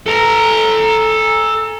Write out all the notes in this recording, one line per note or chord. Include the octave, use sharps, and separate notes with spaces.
A4 A#5